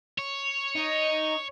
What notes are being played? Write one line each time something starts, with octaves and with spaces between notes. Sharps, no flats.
C#5
D#4